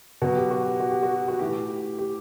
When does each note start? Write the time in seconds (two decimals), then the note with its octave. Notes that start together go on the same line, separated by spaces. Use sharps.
0.22 B2 F#3 F#4
0.36 G4
0.51 F#4
0.66 G4
0.80 F#4
0.91 G4
1.03 F#4
1.28 F#4
1.39 A2 E3 G4
1.98 G4